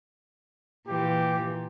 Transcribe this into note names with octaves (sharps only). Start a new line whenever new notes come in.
A#2 E3 G4